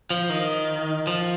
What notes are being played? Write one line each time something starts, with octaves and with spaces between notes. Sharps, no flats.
F3
D#3
F3